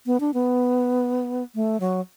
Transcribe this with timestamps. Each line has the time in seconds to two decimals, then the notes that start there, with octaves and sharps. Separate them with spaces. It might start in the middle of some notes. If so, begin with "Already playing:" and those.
0.06 B3
0.20 D4
0.34 B3
1.55 A3
1.80 F#3